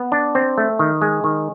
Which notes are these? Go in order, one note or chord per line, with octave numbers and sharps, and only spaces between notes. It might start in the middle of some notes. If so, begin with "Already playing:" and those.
Already playing: B3
D4
C4
A3
D#3
G#3
D#3